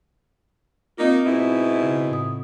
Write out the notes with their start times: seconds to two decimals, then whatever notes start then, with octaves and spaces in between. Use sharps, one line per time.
0.97 A#3 C4 D#4 F4
1.24 G#2 B2 E4
1.83 C#3
2.10 A2 D#6